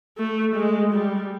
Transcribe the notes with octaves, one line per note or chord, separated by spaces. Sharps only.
A3
G#3
G3